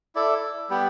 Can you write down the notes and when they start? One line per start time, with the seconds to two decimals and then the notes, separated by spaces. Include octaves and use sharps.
0.15 E4 A4 D5
0.69 G3 B3 G4